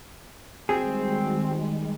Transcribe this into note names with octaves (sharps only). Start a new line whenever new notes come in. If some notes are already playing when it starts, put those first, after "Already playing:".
D#3 G3 G#3 C4 F#4 G#4